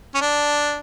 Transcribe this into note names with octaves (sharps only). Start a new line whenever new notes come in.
C#4
D4